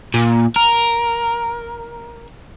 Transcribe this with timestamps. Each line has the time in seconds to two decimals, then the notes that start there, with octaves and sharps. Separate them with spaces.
0.14 A#2
0.56 A#4